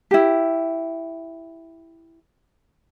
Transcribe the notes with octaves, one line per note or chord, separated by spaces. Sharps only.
E4 G4